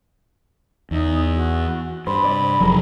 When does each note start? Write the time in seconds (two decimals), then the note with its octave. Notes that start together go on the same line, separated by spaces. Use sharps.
0.91 E2 D#4
1.36 F#4
2.07 G2 C5 B5
2.25 C2 D5
2.60 F1 F3 F#3 G#3 A#4